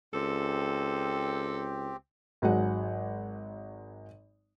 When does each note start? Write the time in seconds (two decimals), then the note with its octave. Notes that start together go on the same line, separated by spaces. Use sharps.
0.13 C#2 C4 G4 A4
2.42 G#1 F#3 G#3 F#5